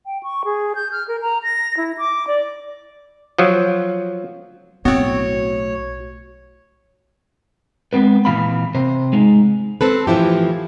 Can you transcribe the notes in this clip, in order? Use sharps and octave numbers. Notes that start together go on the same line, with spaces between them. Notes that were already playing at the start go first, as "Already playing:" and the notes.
G5
C#6
G#4
G6
F6
A#4
A#5
A#6
E4
D6
D5
F3 F#3
B1 A2 B3 C4 F#4 C#5
G#3 B3 C4 B4
A#2 E3 F5 B5
C3 C5
G#3 D#4
C4 A4 B4
A2 E3 F3 E4 G4